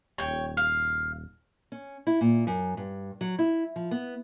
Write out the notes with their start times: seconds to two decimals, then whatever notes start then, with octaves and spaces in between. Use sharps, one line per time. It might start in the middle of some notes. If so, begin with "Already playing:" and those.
0.18 D#1 C#5 G5
0.57 F5
1.72 C#4
2.07 E4
2.21 A#2
2.47 F#2
2.77 G2
3.21 F#3
3.39 E4
3.76 F3
3.91 B3